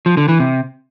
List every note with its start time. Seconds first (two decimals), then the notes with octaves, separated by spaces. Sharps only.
0.06 F3
0.17 D3
0.28 E3
0.40 C3